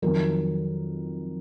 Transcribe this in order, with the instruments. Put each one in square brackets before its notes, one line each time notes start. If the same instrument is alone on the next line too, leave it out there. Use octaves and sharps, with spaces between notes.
[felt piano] F2 D#3 F#3 A#4